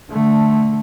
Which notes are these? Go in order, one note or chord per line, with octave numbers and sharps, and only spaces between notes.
D3 A3